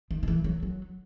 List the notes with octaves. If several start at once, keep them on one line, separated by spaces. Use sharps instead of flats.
D#3
D#3
E3
F#3
F#3